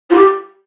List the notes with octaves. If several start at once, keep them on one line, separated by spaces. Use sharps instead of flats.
F4
G4